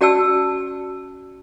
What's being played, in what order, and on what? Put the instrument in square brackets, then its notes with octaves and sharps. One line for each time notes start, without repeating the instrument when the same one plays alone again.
[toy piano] C#4 F#4 D5 G5 A5 E6